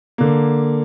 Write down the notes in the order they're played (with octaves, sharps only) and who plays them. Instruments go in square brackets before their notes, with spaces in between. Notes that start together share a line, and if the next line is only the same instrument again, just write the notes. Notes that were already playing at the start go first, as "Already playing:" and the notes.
[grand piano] D3 A#3